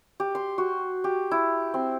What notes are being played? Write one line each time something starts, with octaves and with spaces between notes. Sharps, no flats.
G4
C6
F#4
G4
E4
C4